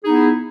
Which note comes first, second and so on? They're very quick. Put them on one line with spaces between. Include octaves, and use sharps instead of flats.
G#4 D#4 B3 E4